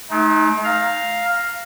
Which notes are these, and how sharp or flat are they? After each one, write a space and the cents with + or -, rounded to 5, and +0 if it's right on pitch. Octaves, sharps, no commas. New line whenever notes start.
A3 -45 D#4 +10
F5 +0 A#5 +0